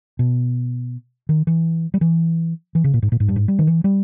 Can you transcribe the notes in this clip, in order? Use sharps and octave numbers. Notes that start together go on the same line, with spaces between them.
B2
D#3
E3
G3
E3
E3
C#3
A#2
G#2
A#2
G#2
G2
G#2
G3
D#3
E3
G3